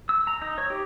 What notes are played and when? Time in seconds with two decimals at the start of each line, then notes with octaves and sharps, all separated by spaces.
0.09 E6
0.27 A#5
0.42 D#4
0.58 C#5
0.70 G4